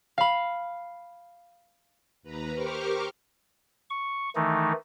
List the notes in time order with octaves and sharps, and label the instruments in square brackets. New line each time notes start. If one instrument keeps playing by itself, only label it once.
[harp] F5 B5
[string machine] D#2 B4 A#5
G4 A#4 C5 C#6 D6 F6
[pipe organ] C#6
D#3 E3 A3 D#4